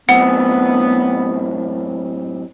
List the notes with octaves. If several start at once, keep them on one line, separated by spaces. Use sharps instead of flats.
F#2 A2 B3 C4 F#5